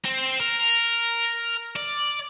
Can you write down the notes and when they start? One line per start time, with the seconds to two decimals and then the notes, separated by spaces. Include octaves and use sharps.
0.05 C4
0.40 A#4
1.76 D5